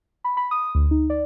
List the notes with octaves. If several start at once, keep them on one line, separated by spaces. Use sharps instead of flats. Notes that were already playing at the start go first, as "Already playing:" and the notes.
B5
B5
D#6
D2
D#4
D5